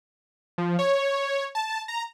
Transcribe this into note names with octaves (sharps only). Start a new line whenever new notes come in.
F3
C#5
A5
A#5